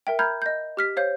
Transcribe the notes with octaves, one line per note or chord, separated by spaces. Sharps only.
A#4 E5 G5
A#5 B5 F6 G6 G#6
D#5 G6
G4 F6 B6
C5 C#5 F5 G6